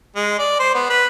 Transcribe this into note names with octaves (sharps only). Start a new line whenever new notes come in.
G#3
D5
C5
B3
B4